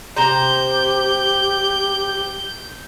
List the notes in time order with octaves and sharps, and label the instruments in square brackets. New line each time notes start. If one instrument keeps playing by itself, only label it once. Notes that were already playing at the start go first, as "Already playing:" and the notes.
[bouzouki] C3 C5 A#5 [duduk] G4 [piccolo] G6